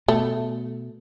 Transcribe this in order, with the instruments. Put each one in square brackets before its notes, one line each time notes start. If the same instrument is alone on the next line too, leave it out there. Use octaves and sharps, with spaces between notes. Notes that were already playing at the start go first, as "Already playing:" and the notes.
[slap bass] B2 [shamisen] A3